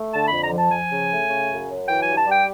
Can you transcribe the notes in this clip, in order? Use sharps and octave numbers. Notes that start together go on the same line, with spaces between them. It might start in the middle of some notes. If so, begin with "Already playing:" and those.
Already playing: A3
D3 A5
F2 B5
A#5
F3 A5
F3 G#5
C#3
A3
C#3
F#2
F#3
E3 G5
G2 G#5
A5
G3
G5